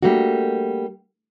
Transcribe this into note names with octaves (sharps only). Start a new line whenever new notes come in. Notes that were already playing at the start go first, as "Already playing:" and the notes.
G3 A3 A#3 D4 F#4